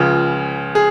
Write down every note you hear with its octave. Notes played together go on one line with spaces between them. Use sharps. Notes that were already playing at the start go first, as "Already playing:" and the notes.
Already playing: C#2 C#3 F3
G#4